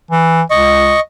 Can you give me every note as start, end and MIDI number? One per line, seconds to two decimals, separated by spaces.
0.11 0.42 52
0.51 0.94 37
0.51 1.00 75
0.51 1.00 85